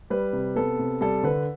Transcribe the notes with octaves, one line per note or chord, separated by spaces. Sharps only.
G3 B4
C3
B3 A4
C3
G3 A4
D3 B4